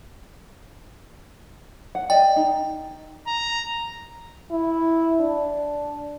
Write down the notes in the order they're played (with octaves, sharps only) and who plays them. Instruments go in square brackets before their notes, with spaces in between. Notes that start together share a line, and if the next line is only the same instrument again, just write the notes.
[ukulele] F#5
[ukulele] D5 D#5 [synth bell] G5
[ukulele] D#4
[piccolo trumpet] A#5
[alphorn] E4
D4